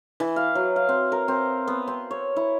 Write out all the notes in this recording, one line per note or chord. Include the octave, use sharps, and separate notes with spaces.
E3
F5
F#3
F5
C4
A#4
C4
B3
C4
C#5
E4